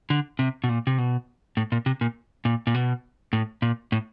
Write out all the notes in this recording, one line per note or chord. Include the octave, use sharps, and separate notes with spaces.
D3
C3
B2
A#2
C3
B2
A2
A#2
C3
A#2
A#2
A#2
B2
A2
A#2
A2